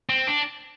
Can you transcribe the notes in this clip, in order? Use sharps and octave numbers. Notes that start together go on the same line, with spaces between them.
C4
D4